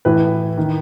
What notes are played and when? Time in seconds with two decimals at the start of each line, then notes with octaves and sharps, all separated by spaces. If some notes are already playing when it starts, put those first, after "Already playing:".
0.05 A2 E3 B4
0.58 D#3